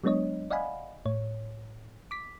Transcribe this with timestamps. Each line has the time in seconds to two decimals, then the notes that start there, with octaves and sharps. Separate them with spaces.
0.04 F#3 G#3 B3 D4 C#5 D#5
0.50 D5 D#5 F5 F#5 G#5 B5
1.06 A2 C#5
2.11 D6 B6